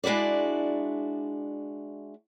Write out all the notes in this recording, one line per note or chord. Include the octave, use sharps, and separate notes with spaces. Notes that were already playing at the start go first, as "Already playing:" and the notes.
G#3 D4 E4 F#4 D5